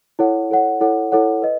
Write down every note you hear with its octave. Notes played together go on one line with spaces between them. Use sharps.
E4 A4 C#5 F#5
E4 A4 C#5 F#5
E4 A4 C#5 F#5
E4 A4 C#5 F#5
B4 D#5